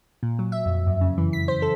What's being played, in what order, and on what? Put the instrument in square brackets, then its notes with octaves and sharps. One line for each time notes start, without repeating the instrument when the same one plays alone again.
[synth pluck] A#2
F#3
E5
F2
F#2
C#3
E3
B6
C5
A4